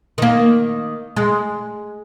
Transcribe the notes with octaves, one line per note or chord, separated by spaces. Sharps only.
D#3 A#3
G#3